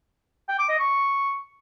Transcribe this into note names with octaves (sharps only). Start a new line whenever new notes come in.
G5
D6
D#5
C#6